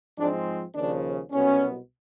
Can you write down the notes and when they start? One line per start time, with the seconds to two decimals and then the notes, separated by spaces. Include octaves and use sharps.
0.18 G#2 F3 G#3 C4 D4
0.75 D#2 C#3 F3 D4
1.31 C2 B2 F#3 B3 C#4